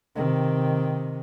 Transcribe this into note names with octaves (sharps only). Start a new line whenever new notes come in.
C3 D#3